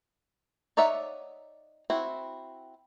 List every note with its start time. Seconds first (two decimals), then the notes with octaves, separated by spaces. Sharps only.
0.77 D#4 C#5 D5 E5 F#5
1.90 C4 E4 F#4